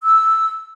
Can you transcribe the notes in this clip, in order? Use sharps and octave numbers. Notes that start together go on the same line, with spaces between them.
E6